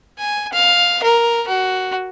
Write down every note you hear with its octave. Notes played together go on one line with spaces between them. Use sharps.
G#5
F5
A#4
F#4